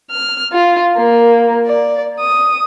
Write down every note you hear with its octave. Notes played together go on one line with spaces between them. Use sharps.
F6
F4
A#3
D5
D#6